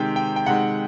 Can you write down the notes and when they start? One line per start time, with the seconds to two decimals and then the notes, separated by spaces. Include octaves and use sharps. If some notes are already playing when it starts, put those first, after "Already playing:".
Already playing: C3 D#3 G#3 G5
0.16 G5
0.36 G5
0.46 C3 D#3 G#3 F#5